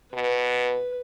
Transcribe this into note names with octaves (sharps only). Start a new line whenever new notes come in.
B2 B4